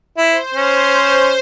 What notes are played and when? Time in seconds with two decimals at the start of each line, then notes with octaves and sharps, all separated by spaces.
0.17 E4 C5
0.54 C#4